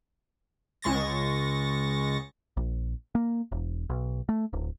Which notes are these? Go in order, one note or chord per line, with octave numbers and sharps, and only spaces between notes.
C#2 G#3 C#6 A6 A#6
A#1
A#3
E1
B1
A3
D1